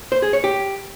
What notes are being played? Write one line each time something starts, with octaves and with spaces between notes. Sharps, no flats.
C5
G#4
C#5
G4